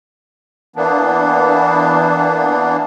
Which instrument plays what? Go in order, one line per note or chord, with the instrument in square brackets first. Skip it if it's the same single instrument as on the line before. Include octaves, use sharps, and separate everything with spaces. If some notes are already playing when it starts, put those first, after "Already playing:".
[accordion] E3 A#3 B3 D4